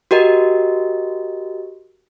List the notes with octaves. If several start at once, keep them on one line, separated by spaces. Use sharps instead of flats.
F#4 G4 A#4 D#5